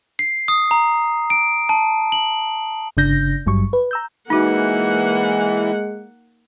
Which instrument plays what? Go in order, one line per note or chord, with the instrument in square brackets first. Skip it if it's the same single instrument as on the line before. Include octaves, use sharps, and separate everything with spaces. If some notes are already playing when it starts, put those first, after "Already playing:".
[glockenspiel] C7
D#6
A#5
D7
A5
F#7
[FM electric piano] G1 C#3 D4 G6 A#6
G#1 G2 F#3 G3 C#6
B4
A#5 E6 G6
[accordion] E3 [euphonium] G#3 [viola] A#3 F#5 [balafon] D#4 F#4